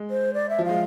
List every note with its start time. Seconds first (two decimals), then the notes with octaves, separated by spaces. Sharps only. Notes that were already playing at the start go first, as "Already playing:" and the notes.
Already playing: G#3
0.10 C5
0.34 D5
0.49 E5
0.58 F3
0.65 G#3 F5